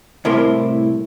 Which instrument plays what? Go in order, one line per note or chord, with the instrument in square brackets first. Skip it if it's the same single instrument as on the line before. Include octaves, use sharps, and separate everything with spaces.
[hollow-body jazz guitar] C2 A2 C3 E4 A#4 C6